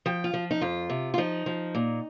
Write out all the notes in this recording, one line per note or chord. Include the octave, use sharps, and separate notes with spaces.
F3 G5
F4
F3
D#4
F2 F4
C3
F4
F3 D#4
F3
A#2